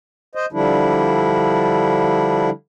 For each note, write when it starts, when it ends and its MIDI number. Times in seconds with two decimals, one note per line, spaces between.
0.35 0.46 72
0.35 0.46 75
0.53 2.50 50
0.53 2.50 53
0.53 2.50 55
0.53 2.50 62
0.53 2.50 64